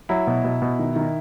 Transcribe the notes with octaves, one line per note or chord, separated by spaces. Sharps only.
F#3 E4
B2
B2
B2
D#3
D#3